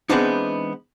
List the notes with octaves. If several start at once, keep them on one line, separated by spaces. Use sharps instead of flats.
E3 G#3 B3 C4 D4 D#4